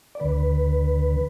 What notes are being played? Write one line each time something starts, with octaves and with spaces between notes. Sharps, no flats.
D5
D2 D3 B4